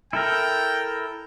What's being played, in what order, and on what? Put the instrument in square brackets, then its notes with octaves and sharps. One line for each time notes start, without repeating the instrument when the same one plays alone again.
[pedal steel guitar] E4 A4 A#4 [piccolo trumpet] G5